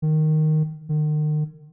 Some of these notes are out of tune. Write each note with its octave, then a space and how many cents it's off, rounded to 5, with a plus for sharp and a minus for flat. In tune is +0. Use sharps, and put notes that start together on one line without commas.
D#3 -5
D#3 -40